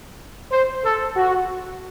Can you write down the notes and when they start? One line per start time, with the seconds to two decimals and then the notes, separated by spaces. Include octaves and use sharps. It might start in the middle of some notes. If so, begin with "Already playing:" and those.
0.52 C5
0.84 A4
1.16 F#4